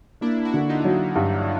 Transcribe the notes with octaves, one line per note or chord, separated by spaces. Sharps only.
A#3 D4 E4
E4 F#4
D3
D#4 F4
F#3
G2